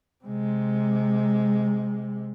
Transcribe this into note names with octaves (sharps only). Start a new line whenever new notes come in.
C3 G#3